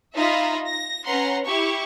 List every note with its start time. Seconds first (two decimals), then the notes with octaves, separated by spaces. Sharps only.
0.15 D#4 F4 E5 A#5 B5
0.65 A#6
1.06 C#4 B4 F#5 A#5 C6
1.44 E4 G4 C#6